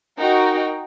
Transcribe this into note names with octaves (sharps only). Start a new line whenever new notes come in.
D#4 F#4 A#4 G5